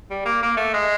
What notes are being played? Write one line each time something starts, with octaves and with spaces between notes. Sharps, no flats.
G3
A#3
A#3
A3
G#3